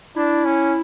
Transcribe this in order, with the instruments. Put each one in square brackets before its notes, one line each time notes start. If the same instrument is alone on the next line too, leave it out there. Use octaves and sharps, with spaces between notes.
[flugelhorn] D4 [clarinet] E4
[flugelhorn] C#4